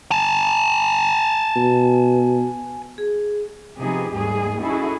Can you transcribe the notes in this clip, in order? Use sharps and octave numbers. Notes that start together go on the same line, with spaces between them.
G#5 A5
B2
G#4
C3 F3 B3 D#4 G4 G#4
D#2 G#2 G3 A3 G#4
C#4 D#4 E4 F#4 G#4 A4